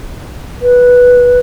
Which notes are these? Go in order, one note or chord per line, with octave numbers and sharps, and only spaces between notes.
B4